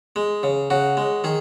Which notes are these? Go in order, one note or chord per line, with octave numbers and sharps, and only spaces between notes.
G#3
C#3
C#3 F#4
G#3
D#3 G#4